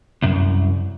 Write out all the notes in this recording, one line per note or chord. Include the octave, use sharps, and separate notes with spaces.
C2 F#2